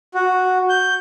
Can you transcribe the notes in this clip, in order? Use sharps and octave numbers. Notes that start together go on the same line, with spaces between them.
F#4
G6